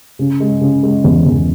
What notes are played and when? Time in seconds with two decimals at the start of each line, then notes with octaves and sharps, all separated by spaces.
0.19 C#3
0.40 G#3
0.61 C#3
0.83 G#3
1.04 E2
1.26 E2